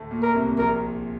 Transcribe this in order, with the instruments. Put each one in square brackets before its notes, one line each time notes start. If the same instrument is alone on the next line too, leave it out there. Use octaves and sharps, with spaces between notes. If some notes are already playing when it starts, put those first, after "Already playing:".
Already playing: [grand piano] D2 A2 D3 A3
A#2 A#3
[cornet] A#4
[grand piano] C2 C3
C3
[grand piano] A#1 A#2 [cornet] A#4